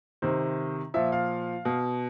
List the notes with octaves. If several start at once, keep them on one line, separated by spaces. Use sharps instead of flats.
C3 D#3 C5
A#2 F3 E5
F5
B2